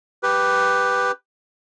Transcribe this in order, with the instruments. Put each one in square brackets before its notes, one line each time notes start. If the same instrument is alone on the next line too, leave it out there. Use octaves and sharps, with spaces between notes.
[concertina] G4 B4